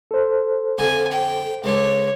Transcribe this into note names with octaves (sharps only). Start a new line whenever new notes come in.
A4 C5
F2 D3 F#4 G#5
G5
C#2 G#3 D4 C#5